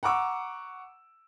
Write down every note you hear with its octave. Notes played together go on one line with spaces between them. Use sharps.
F#5 A#5 C#6 D6 E6